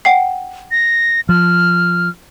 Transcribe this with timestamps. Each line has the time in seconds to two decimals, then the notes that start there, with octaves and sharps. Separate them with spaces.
0.05 F#5 G5 C7
0.71 A#6
1.29 F3 F6